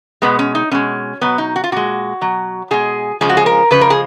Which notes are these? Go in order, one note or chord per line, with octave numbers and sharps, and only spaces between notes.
B2 G#3 B3
C#4
D#4
B2 G#3 C#4
B2 F#3 B3
D#4
F#4
F4
A#2 G#3 F#4
B2 F#3
B2 G#3 G#4
C#3 F3 G#3 G#4
F#4
G#4
A#4
C#3 F3 G#3 B4
A#4
G#4